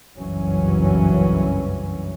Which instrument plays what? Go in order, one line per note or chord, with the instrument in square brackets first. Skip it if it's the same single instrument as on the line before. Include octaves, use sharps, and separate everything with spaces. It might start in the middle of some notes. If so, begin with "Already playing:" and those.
[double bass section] F#1 C2 G2 E3 F#3 C#4